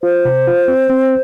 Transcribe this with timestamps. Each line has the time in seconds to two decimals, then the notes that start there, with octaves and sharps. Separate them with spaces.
0.03 F4 C5
0.25 C3
0.47 F4
0.68 C4
0.90 C4